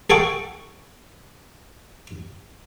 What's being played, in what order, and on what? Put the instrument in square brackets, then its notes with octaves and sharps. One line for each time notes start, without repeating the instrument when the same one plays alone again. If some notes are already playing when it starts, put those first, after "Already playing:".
[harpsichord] G#4 A4 F#5 G5 C#6